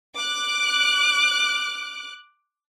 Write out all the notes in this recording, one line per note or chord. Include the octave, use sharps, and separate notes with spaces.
D6 F#6